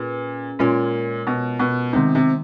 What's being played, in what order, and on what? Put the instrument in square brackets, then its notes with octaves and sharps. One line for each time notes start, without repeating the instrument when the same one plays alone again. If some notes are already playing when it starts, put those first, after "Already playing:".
Already playing: [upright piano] A#2 [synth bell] C#4 G#4 B4
[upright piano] A#2 [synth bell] G#3 C#4 F4 A#4 C#5
[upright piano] B2
B2
[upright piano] C3 [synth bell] D#3 G#3 B3 D#4
[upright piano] C3